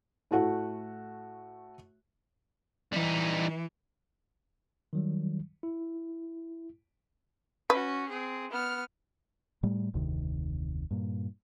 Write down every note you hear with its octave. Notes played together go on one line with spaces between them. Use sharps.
A2 A3 F#4 F#5
E3 G3 D#4
D#3 F#3 G3
E4
C#4 F#4 B4
C4 G#4
B3 F6
A2 G3 A3
F1 D2 C3 D#3
G2 A#2